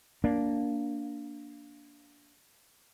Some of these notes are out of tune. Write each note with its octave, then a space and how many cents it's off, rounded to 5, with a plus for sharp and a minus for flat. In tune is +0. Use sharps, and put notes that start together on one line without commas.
A#3 +0 D4 -20